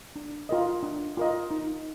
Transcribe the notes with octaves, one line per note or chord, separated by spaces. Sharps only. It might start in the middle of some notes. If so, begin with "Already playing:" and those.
D4
F4 A#4 D#5
D4
F4 A#4 D#5
D#4